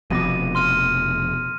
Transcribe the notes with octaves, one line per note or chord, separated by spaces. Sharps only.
F1 F2 B2 D6 A#6 D#7
C6 F6 D#7